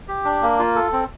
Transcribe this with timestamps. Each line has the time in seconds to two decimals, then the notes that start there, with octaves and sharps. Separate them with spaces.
0.08 G4
0.25 D4
0.42 A#3
0.59 F4
0.75 A4
0.92 C4